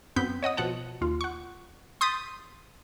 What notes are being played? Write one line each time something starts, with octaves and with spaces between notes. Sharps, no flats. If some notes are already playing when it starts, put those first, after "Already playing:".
F#2 B3 C4 G6 B6
C#5 D#5 F#5 D#6
B2 F3 F#5 A5
D#2 F4
F#5 C#6
C6 D#6 G6 A6 B6